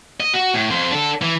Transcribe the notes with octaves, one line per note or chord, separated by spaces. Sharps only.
D#5
F#4
A2
F2 C5
D4 A4
E3